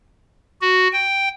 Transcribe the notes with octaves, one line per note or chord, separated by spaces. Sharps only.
F#4
G5